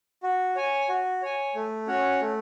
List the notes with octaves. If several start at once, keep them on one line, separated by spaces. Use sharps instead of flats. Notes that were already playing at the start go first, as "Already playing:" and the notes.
F#4
C#5 G#5
F#4
C#5 G#5
A3
C#4 F#4 C#5 F#5
A3